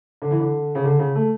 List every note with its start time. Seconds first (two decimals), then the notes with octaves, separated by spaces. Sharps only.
0.22 D3
0.31 E3
0.40 D3
0.75 C#3
0.84 D3
0.99 C#3
1.15 A3